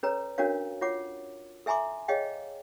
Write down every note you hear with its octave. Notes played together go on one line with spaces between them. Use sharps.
C#4 A4 B4 C#5 A#5
C#4 D4 F#4 A#4 C#5 F5
F4 C#5 F#5 D6
A4 E5 G#5 A#5 C6 D6
G#4 C#5 D#5 F5 G5